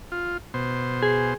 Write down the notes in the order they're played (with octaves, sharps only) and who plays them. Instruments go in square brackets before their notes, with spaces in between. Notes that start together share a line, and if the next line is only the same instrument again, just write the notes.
[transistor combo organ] F4
B2 C5
[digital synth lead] G#4